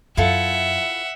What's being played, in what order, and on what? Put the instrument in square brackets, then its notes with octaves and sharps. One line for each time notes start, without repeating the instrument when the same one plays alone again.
[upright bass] F#2 [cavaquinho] E4 F4 A4 [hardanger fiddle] E5 F#5